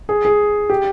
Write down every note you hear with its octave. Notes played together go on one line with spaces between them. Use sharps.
G#4
G#4
G4